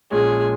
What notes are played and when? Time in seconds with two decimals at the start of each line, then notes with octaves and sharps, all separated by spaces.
0.11 A#1 A#2 G#3 C#4 G#4